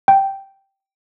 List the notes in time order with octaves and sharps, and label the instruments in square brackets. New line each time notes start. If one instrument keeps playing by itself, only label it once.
[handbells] G5